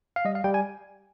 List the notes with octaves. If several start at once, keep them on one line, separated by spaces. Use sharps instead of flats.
F5
G3 D#5
F5
G3 G5
G#5